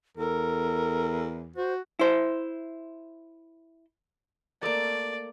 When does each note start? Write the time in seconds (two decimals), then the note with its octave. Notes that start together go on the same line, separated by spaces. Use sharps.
0.17 E2 A4 A#4
1.56 F#4 C5
1.99 E4 C5
4.63 A3 A#3 D5